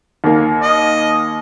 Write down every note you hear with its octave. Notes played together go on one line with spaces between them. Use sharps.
D#2 A#3
D#5